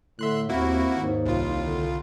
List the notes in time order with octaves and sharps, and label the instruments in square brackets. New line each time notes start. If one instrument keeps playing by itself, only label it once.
[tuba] A2 [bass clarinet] D3 [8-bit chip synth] E5 C6 F#6
[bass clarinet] D#2 [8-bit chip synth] A#3 E4 F#4 [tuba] C4
[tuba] D#2 [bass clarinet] G#2
[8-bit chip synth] C2 F4
[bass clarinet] D3